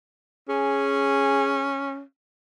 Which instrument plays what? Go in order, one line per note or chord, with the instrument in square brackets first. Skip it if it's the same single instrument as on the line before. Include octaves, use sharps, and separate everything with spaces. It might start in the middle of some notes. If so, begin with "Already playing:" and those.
[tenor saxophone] C#4 [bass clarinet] G#4